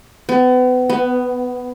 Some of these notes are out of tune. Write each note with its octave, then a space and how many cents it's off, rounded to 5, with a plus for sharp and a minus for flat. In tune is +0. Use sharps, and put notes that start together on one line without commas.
B3 +35
B3 +10